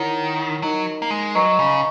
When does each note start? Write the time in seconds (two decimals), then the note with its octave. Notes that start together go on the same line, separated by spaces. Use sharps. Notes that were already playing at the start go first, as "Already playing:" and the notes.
Already playing: D#3 E4 A#4 C#5 F#5
0.63 F#3 D#4 A#4 D#5
1.02 A#3
1.10 G#3
1.35 F#3 B4 D#5 A#5 C#6
1.59 C#3